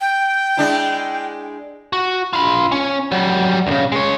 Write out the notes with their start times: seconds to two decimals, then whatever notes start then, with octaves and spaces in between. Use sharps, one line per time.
0.01 G5
0.57 G#3 D4 E4
1.93 F#4
2.33 F4 B5
2.72 C#4
3.12 F#3 G3
3.67 D2 C#3
3.92 G#3 C#5